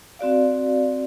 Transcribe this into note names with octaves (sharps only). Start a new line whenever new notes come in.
C4 F#4 D5 F5